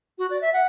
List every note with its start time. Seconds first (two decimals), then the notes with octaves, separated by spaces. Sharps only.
0.18 F#4
0.30 D5
0.41 E5
0.53 F#5